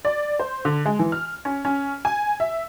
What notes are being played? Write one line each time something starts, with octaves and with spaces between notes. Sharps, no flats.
D5
C5
D3
G#3
E3
F6
C#4
C#4
G#5
E5